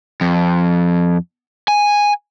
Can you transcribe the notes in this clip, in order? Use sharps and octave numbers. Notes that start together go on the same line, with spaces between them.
F2
G#5